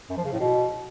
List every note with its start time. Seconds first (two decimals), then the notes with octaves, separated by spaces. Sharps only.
0.09 F#2
0.17 F3
0.25 C#3
0.33 A2
0.40 B2